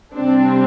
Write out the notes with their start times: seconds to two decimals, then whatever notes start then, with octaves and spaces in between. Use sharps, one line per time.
0.13 C3 G3 C4 D4